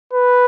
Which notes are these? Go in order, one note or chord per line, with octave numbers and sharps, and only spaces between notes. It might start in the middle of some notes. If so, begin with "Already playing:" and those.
B4